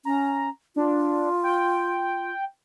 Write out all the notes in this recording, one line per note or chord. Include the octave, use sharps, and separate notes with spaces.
C#4 A#5
D4 F4
G5